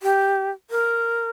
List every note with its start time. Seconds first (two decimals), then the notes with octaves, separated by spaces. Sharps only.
0.03 G4
0.70 A#4